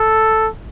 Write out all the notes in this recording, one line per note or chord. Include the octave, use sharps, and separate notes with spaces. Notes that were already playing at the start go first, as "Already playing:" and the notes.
Already playing: A4